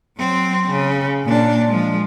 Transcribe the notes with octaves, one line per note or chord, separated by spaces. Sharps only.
F#3 C4
C#3
A#2 D4
F3 G#3